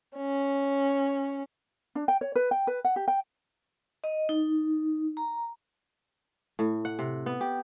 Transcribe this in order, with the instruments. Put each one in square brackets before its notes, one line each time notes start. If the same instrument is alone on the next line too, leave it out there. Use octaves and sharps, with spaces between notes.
[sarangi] C#4
[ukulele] D4
G5
C#5
B4
G5
B4
F#5
G4
G5
[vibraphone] D#5
D#4
A#5
[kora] A2
F#5
C3
B3
G4